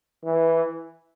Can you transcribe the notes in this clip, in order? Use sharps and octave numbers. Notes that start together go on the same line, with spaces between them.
E3